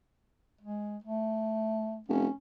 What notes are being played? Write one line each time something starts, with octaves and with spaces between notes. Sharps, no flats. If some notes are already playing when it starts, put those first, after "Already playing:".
G#3
A3
F1 C#4